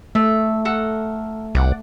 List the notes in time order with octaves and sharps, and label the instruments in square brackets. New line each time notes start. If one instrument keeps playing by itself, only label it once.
[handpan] A3 [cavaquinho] E5
[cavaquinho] A4 A#4 F#5
[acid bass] C2 [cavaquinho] D5 F#5